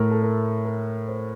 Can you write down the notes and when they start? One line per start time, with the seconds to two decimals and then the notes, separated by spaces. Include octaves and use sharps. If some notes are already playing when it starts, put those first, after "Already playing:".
Already playing: A2 A3 A#4
0.11 A4
0.23 A#4
0.65 A#4
1.08 C5